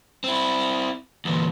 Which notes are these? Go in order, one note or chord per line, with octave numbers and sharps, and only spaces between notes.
C4 E4
D2 A#2 E3